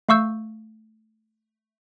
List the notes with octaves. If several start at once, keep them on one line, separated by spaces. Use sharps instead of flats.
A3 F5 C#6 E6 G6